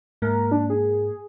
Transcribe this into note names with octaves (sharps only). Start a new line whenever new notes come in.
G#2 A#3 A#4
D4
G#4